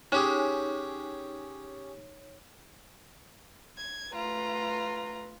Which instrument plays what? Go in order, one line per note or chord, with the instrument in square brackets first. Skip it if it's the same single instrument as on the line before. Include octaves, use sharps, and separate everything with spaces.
[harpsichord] C#4 G4 G#4 [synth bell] D#4 C#5
[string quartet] G#6
[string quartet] A3 F4 [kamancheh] B4 A#5